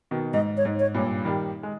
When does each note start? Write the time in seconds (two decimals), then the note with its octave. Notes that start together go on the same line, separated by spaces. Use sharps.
0.11 B2 D#3
0.34 G#2 D#5
0.57 C#5
0.65 G#2
0.80 C#5
0.94 G2 A#2
1.25 D#3 G3
1.63 G#3